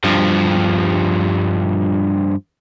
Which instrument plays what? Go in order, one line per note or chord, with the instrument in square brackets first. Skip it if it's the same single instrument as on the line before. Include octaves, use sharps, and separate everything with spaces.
[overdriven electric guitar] G2 F3